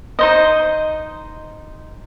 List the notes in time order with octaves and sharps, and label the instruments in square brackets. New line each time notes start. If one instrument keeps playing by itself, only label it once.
[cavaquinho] D#4 C5 D#5